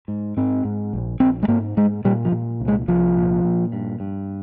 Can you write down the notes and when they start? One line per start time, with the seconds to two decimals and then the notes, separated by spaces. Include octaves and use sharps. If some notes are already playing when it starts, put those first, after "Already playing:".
0.08 G#2
0.37 G#2 C4
0.65 G#2
0.93 A#1
1.20 A#1 C4
1.43 G#3
1.48 G#2 A#3
1.77 G#2 G#3
2.05 A#2 G3
2.25 F3
2.32 A#2
2.60 C2
2.68 G#3
2.88 C2 F3
3.17 A#2
3.44 A#2
3.72 G2
4.00 G2